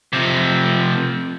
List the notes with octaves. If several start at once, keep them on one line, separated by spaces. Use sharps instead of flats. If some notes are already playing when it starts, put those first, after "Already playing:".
C3 F3